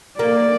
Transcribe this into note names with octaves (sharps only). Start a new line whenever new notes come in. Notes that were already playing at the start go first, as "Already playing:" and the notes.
A#3 D5